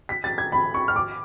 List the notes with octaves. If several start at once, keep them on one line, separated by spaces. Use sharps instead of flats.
B6
A6
G#6
B5
C#6
F6
D6